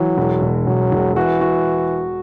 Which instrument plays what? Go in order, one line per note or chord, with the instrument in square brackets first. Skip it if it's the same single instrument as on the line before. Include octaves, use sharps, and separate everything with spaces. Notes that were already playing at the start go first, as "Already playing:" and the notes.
Already playing: [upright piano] E3 [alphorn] F#3
[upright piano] E1
E1
[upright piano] E1 [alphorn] F#3
[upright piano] E1
[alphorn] E3 [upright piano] F#4
[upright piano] F#4